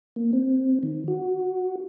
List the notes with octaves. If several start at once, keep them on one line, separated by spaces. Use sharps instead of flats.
A#3
C4
D#3
F#4